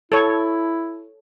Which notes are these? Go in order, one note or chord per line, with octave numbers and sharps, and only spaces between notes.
E4 A4 C#5